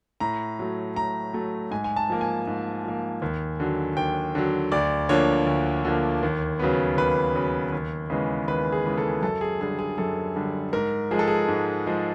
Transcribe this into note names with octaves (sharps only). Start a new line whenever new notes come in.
A2 A#5
F#3 A3
A2 A#5
F#3 A3
G#2 G#5
G#5
A5
F3 A#3
G#5
G#2
F3 A#3
D#2
D3 F#3
D#2 G5
D3 F#3
D2 D5
D3 F3 A#3 C#5
D2
D3 F3 A#3
D#2
C#3 F#3 B3
D#2 B4
C#3 F#3 B3
D#2
C#3 E3 G#3 B3
D#2 B4
G#4
C#3 E3 G#3 B3
A4
F#2 A4
G#4
D3 G3 G#4
G#4
F#2 A4
D3 G3
G#2 A#4
F3 G#3 G#4
A4
G#4
G#2
F3 G#3